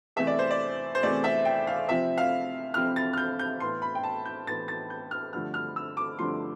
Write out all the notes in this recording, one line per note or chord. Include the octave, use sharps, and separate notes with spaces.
E2 C3 E3 A3 E5
D5
C5
D5
C5
E2 C3 E3 A3 D5
E5
G5
F5
C3 F3 C4 E5
F5
C3 F3 C4 F6
A6
F6
G6
G6
A2 E3 B3 C6
B5
G5
A5
G6
A2 E3 B3 A6
A6
G6
F6
G2 D3 F3 A3 F6
F6
E6
D6
G2 D3 F3 A3 C6